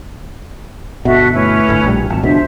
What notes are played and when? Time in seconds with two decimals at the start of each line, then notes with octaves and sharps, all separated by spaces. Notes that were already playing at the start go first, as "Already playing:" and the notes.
1.05 G1 B2 F#4 A4 E5
1.33 A3 C#4 E4 B4
1.69 G1 A2
1.84 A#1 G3
2.10 G#1 A5
2.23 C#2 F#2 B2 D4 C5 E5